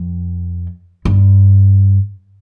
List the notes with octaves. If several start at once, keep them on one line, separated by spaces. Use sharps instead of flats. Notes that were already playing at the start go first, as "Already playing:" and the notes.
Already playing: F2
G2